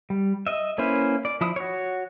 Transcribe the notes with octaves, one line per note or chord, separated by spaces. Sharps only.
G3
D#5 E5
A#3 C#4 E4 B4 C5
D5
F3 E4 D#6
F#4 C#5